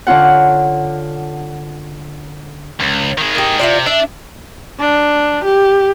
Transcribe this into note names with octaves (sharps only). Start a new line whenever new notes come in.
D3 C#4 F4 F#5
C#2
D#3 G#4
A#3 G4
C3 E4 F4 D5
D4 E5
D4
G4